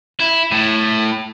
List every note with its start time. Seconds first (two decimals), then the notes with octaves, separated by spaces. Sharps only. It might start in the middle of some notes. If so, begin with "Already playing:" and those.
0.20 E4
0.52 A2